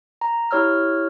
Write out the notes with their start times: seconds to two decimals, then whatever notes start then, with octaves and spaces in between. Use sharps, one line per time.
0.21 A#5
0.51 E4 G4 C#5 E6 F6